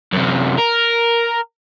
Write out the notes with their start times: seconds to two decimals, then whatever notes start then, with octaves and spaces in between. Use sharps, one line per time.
0.13 F#2 C3
0.58 A#4